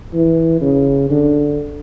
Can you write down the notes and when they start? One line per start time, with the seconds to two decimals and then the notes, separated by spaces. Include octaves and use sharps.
0.13 E3
0.61 C#3
1.10 D3